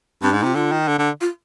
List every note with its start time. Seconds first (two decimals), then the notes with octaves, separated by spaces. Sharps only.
0.22 G2 C4
0.30 D4
0.33 G#2
0.39 D#4
0.43 C3 F4
0.55 D3 F4
0.72 D#3
0.88 D3
0.98 D3
1.21 F4